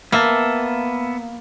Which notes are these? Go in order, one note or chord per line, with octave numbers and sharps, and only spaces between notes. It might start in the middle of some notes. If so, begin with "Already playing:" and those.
A#3 B3 E5 A5